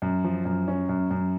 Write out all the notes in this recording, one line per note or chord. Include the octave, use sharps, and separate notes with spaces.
F#2
F3
F#2
C#4
F#2
F#2